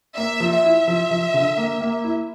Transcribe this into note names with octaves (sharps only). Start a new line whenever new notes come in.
A#3 E5
F3
E5
E4
F3
F3
D3
A#3
A#3
E4